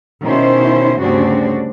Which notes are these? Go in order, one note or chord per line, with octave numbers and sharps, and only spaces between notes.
B2 D#3 C#4 E4 C5
D2 G2 C#3 C4 D4 F#4